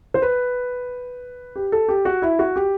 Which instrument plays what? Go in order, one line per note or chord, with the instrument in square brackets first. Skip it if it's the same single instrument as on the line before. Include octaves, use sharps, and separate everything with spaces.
[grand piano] C5
B4
G4
A4
G4
F#4
E4
F#4
G4